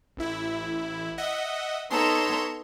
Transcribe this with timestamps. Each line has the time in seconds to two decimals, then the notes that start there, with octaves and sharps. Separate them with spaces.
0.17 A1 E4
1.18 D#5 E5 F#5
1.90 B3 D#4 A4 C#5 A#5 C6